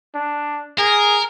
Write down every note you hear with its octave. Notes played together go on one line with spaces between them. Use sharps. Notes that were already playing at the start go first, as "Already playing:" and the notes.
D4
G#4 A#4